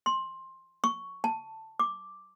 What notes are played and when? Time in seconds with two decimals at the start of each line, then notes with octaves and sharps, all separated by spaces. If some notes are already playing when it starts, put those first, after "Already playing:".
0.06 C6
0.84 C#6
1.24 A5
1.79 D6